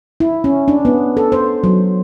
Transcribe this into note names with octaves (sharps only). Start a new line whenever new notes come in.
E4
C#4
D4
B3
A4
C5
F#3